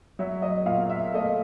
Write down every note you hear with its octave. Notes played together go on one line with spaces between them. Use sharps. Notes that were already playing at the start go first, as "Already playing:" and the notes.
F#3 E5
D#5
A#2 F5
E5
A3 D#5